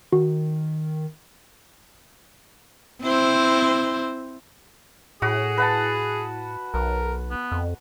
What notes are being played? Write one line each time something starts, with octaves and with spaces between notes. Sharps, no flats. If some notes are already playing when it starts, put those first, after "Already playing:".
D#3 F#4
C4 E4 C5
A2 F#4 G#4
B4 F#5 A5
B1 A#4
B3
F2